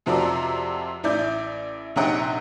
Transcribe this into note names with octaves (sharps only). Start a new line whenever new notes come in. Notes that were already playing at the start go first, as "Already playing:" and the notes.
F2 C3 F3 F#4 A#4 D5
A1 E4 D5 G6
A#1 C3 D#4 C#5 F#5 G5